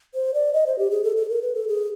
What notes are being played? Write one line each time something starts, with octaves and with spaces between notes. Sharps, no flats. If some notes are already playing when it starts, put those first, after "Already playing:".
C5
D5
D#5
C5
G4
G#4
A4
A4
A#4
B4
A4
G#4